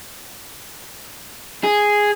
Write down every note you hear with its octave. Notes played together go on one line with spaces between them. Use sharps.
G#4